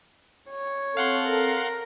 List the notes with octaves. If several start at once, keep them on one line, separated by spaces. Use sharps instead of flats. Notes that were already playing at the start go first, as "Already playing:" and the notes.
C#5
C4 A4 F5 F#5 C6
A#4